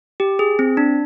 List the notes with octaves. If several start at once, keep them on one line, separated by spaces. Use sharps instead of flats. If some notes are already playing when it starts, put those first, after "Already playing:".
G4
G#4
C4
D4